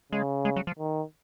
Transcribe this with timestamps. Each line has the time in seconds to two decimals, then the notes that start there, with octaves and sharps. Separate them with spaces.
0.12 C#3 G#3
0.45 G#3
0.56 F#3
0.67 F3
0.79 D#3